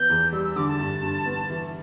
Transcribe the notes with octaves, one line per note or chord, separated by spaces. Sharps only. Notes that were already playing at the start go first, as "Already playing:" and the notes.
Already playing: E3 B3 G6
E2
G3 E6
E6
D3 D6
A5
G2
G2
B3
E3